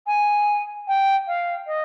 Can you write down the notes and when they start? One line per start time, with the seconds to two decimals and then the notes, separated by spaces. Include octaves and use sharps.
0.07 G#5
0.88 G5
1.27 F5
1.67 D#5